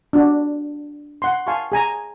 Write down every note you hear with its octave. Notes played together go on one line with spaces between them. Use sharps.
D4 F#4 D5
F#5 C6
F5 G#5 A5 C6 C#6
G#4 G#5 A#5